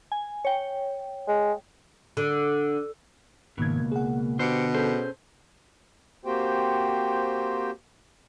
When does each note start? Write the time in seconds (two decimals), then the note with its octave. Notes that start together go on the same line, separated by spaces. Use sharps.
0.12 G#5
0.45 C#5 G5
1.28 G#3
2.17 D3
3.58 C#2 G#2 B2 D#3 A#3 G#6
3.92 G#4 F#5
4.39 B2 D3 G4 C5 C7 C#7
4.74 C#4 G#4 A4 C5 G6
6.25 A#3 C4 F#4 G4 C5 G5